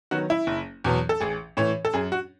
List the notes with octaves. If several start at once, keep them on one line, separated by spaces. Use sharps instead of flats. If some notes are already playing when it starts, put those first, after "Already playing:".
D#3 F#3 B3 F#4
E4
F#1
E2 B2 F#3 B3
A4
A1 G#4
A2 E3 C#5
A4
F#2 G#4
F#4